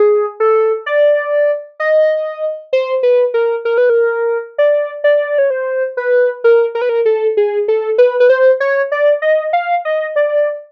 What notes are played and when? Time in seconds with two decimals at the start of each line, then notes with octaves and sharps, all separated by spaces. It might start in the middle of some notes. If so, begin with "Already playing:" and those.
Already playing: G#4
0.40 A4
0.86 D5
1.80 D#5
2.73 C5
3.03 B4
3.34 A#4
3.65 A#4
3.78 B4
3.90 A#4
4.58 D5
5.04 D5
5.38 C#5
5.50 C5
5.97 B4
6.44 A#4
6.75 A#4
6.82 B4
6.89 A#4
7.06 A4
7.37 G#4
7.68 A4
7.98 B4
8.20 B4
8.30 C5
8.60 C#5
8.92 D5
9.22 D#5
9.53 F5
9.85 D#5
10.16 D5